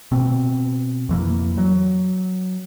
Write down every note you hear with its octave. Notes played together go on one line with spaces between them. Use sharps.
B2 C4
F2 E3 A#3
F#3